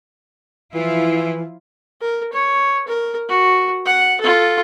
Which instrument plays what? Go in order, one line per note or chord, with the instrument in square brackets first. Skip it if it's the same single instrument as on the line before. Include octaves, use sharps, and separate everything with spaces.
[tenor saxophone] E3 [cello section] F3 E4 F4
[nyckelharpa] A#4
C#5
A#4
F#4
F#5
F4 A4